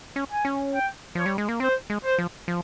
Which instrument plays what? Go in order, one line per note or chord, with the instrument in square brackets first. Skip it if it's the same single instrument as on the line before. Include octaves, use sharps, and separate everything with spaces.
[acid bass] C#4
[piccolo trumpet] G#5
[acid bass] C#4
[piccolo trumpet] G5
[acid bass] F3 [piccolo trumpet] C#5
[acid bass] G3
G#3
A#3
[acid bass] C4 [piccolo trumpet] C5
[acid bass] G#3
[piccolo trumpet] C5
[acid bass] F3
F3